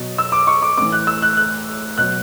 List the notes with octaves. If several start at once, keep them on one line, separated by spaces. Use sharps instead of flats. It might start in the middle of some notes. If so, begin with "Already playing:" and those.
Already playing: B2 F#3
E6
D6
C#6
D6
A2 E3 D6
F#6
E6
F#6
F#6
B2 F#3 F#6